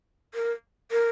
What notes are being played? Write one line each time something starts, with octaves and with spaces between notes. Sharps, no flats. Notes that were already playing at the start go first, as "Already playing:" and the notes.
A#4
A#4